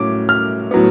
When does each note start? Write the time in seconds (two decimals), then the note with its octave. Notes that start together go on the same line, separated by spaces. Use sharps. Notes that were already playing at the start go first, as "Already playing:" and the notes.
Already playing: A2 F#3 C#4 D6
0.29 F6
0.71 A2 F#3 B3